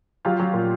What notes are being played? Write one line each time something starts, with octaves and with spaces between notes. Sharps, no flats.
F#3 F4 G4
F#3
A#2